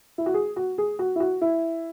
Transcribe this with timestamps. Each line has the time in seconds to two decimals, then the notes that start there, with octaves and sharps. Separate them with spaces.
0.18 E4
0.26 F#4
0.34 G#4
0.56 F#4
0.78 G#4
0.99 F#4
1.16 E4
1.20 F#4
1.41 E4